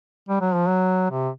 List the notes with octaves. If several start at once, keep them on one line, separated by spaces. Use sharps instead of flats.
G3
F#3
F3
F#3
C3